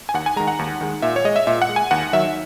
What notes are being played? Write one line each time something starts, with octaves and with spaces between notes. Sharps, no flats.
G#5
D#2 F#5
G#5
D#3 G#3 A#5
F#5
D#2
D#3 G#3
A#2 E5
C#5
G#3 D#5
E5
A#2 E5
F#5
G#3
G#5
D#2 F#5
D#3 F#3 E5